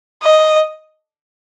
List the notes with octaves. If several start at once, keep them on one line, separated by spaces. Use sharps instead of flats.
D#5